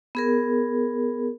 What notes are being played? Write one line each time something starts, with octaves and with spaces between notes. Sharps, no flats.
B3 G#4 A#4